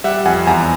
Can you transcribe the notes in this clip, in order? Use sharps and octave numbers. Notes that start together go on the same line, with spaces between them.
G3 E5 F#5
F2 F#5 G#5
E2 G#5 A#5